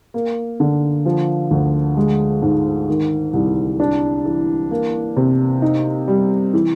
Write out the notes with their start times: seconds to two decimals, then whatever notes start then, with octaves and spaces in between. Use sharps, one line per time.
0.14 A#3
0.60 D3
1.06 F3
1.51 D2
1.97 G#3
2.42 G#2
2.88 D#3
3.33 C2
3.80 D4
4.25 E3
4.71 A#3
5.17 C3
5.62 D#4
6.08 G3
6.54 E3